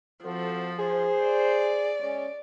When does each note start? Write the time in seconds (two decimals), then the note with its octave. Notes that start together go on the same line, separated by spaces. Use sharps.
0.24 F3 C4 F#4 A4
0.79 G#4 C5
1.22 D5
2.00 G#3 C#4